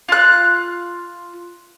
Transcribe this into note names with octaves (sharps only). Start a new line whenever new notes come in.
F4 F#6